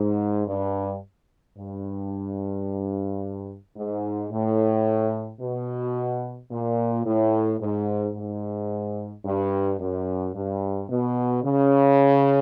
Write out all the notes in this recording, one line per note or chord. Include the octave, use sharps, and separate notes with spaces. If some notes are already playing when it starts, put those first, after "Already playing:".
Already playing: G#2
G2
G2
G#2
A2
B2
A#2
A2
G#2
G#2
G2
F#2
G2
B2
C#3